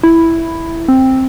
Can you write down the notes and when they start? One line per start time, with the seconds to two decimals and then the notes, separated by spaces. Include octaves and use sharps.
0.03 E4
0.88 C4